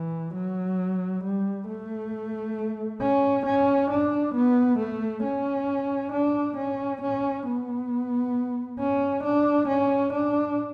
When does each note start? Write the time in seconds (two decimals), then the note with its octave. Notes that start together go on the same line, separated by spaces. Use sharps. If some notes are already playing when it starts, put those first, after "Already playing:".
Already playing: E3
0.35 F#3
1.24 G3
1.68 A3
3.01 C#4
3.46 C#4
3.91 D4
4.35 B3
4.79 A3
5.23 C#4
6.13 D4
6.57 C#4
7.02 C#4
7.47 B3
8.80 C#4
9.24 D4
9.68 C#4
10.13 D4